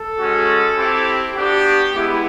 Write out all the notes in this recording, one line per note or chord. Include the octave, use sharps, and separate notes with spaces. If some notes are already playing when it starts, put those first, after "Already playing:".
Already playing: A4
G#3 C#4 F#4
C4 E4 G4
B3 D4 F#4 G4
G#3 B3 E4 G4